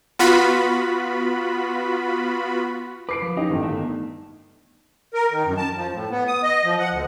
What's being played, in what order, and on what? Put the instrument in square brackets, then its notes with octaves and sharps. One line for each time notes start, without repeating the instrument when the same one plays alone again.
[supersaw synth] B3 F4 F#4 B5
[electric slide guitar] B4 [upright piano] D6 C7 D7
[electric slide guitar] F3
[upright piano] C#4 G4 D#5 [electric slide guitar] D#4
[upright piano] G1 D#3 [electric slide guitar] A2 E3
[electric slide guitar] A3
[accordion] A#4
D#3
F#2
A5
F3
A2
B3
D#6
D#5
F3
F#5
D2